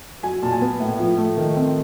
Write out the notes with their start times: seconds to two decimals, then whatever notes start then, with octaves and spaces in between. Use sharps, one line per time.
0.23 F#3 G#5
0.42 A#2 A5
0.52 G#5
0.61 B3
0.80 A2
0.99 F3
1.18 A3
1.37 D#3
1.56 C4